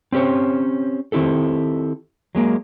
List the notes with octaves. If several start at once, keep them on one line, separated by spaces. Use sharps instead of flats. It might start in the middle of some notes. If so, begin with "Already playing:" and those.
C4 C#4 G4 C5 C#5
D#3 C4 E4 G4 A4
F#3 G#3 A#3